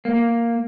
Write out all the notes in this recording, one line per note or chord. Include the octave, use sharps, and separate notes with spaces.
A#3